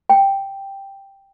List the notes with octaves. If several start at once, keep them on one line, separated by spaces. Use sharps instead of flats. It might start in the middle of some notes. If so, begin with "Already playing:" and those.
G5